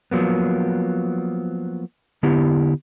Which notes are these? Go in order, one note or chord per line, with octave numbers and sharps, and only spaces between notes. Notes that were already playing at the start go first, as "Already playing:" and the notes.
F3 F#3 A#3 B3
D3 B3 E4 G4